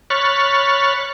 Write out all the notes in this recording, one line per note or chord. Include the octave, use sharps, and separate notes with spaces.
C#5 B5 C#6 F6 F#6 A6